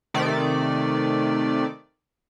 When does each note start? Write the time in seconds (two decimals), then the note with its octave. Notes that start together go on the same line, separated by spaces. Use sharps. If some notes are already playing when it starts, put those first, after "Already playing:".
0.14 C3 D#3 A3 D5